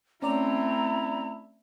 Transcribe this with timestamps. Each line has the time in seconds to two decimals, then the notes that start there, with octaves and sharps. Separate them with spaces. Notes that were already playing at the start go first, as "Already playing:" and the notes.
0.22 A3 C4 C#4 E4 D5 A#5